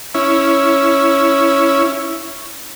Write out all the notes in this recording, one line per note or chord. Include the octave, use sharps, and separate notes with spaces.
C#4 E4